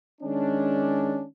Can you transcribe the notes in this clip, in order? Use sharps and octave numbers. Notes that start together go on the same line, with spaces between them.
D#3 G#3 C#4 D4